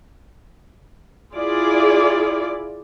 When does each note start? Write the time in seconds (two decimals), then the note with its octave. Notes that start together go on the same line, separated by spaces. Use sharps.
1.36 E4 F4 G#4 D5